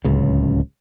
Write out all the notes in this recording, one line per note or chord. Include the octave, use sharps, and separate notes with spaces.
D1 C#2 C#3